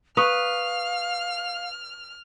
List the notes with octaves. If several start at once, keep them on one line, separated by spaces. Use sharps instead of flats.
B4 F5 C#6 D#6 F6 F7